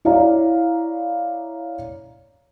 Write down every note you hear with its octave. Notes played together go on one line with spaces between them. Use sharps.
E4 C#5 D5 F5 A#5